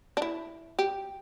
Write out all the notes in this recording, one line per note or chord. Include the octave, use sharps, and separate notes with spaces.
D4
E4
G4